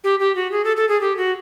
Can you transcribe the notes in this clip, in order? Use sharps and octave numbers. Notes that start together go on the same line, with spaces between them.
G4
G4
F#4
G#4
A4
A4
G#4
G4
F#4